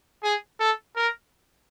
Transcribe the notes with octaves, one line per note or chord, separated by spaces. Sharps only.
G#4
A4
A#4